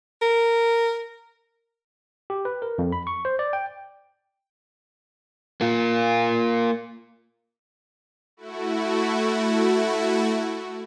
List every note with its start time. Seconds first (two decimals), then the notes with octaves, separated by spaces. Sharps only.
0.22 A#4
2.30 G4
2.45 B4
2.62 A#4
2.78 F2
2.92 B5
3.07 C#6
3.25 C5
3.39 D5
3.53 G5
5.61 A#3 F4
8.37 A3 E4 F#4